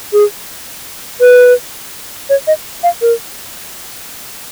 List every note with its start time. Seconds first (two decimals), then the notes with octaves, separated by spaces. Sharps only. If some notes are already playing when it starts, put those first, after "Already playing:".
0.13 G#4
1.21 B4
2.30 C#5
2.47 D#5
2.83 F5
3.02 A#4